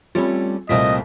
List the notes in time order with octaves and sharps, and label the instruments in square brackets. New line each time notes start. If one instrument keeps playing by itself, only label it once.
[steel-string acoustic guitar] G3 A3 C#4 [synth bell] C4 F4
[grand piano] C2 A#2 [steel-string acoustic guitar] A3 A#3 C4 [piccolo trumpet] D#5 [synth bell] B6